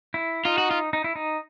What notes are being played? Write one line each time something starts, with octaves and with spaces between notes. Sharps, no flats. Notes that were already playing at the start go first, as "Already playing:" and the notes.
E4
D#4 F4
F#4
F4
D#4
E4
D#4